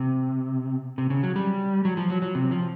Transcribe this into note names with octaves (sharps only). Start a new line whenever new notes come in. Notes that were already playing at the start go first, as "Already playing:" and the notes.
Already playing: C3
C3
C#3
F#3
G3
F#3
F3
F#3
F#3
C3
F3